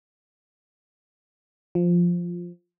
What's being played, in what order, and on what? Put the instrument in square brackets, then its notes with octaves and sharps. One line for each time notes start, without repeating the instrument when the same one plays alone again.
[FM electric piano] F3